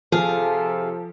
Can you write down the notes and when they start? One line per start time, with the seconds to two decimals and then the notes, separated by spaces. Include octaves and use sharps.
0.12 C3 F3 G#4 A4 F5